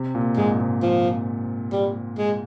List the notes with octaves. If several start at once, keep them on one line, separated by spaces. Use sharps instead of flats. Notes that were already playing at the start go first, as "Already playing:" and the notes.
Already playing: C3
A#2
G#2 G#3
G#2
F3
G3
G#3